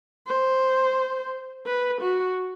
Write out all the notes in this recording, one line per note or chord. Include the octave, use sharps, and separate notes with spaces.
C5
B4
F#4